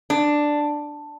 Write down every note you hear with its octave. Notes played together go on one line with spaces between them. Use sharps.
D4